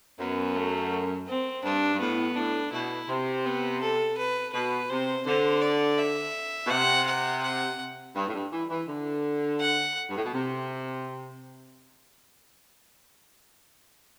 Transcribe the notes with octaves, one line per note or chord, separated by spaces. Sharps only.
F#2 B3
A3
C4
G2 D4
G2
A2 B3
A2 D4
B2 E4
C3 C4
B3
A4
B4
B2 B4
C3 C5
D3 C5
D5
E5
B2
C3 F#5
F#5
F#5
G2
A2
G2
E3
E3
D3
F#5
G2
A2
B2
C3